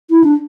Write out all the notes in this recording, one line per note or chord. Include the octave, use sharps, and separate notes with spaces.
E4
D4